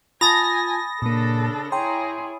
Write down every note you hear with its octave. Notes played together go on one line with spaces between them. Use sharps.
F4 G#5 A5 B5 D#6 A6 A#6
A#2 C#3 A#3 D4 A4
E4 G#4 C#5 G5 A#5 C6